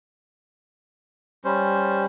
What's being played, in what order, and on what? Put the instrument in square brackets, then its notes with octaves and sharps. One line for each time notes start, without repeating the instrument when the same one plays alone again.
[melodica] G3 C#4 C5